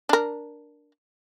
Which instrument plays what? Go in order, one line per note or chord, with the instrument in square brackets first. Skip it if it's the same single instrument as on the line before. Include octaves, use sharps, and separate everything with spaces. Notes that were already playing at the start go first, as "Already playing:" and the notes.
[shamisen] D4 A#4